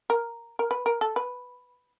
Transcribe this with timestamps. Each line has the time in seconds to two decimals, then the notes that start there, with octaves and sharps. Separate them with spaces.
0.10 A#4
0.59 A#4
0.71 B4
0.86 A#4
1.01 A4
1.16 B4